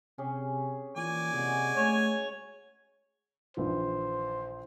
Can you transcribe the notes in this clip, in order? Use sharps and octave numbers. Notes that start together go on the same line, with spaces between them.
C3 C#4 G4 G#4
A#2 E3 D5 G#5
C3 G#3 F#4 G#4
A3 C#5
A#1 D#3 E3 C5